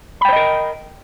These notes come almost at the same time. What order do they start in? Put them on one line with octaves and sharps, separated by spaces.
B5 G5 C5 D#5 A#4